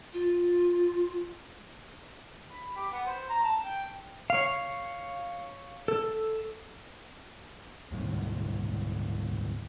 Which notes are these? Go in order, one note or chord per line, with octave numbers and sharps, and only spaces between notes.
F4
B5
G4
B3
C5
A#5
A5
G5
C#5 F5
A4
D2 G#2 D#3 G3